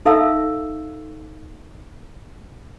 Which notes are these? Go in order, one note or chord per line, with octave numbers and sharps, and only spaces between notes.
D#4 A4 E5 F5 A#5 E6